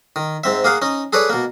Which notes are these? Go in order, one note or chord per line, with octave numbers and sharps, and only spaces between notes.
D#3
G#2 C4 E5
A#3 G#4 F5 F#5
C#4 D#4
G#4 A4 B4 C#5 D5
B2 A#3